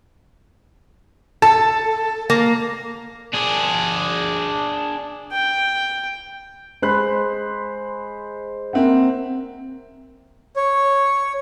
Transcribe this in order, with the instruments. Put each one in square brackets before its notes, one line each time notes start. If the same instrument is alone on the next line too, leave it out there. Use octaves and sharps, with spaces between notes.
[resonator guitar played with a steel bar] A4 [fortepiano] A5
[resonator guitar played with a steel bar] A#3
[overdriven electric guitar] D4 G#4
[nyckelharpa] G5
[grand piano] G#3 C5 B5 C6 F#6
A#3 C4 E5 F#5
[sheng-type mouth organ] C#5